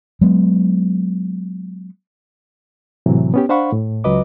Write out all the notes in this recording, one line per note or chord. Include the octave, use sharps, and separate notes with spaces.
F#3 G#3 B3
A2 C3 E3 F#3
B3 C#4 G4
D4 C5 F5 F#5 B5 C#6
A2
C#2 F#3 B4 D#5 D6